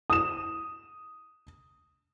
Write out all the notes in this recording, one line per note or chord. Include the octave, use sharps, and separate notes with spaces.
D#6 E7